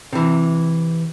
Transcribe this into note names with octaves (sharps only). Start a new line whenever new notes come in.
C3 E3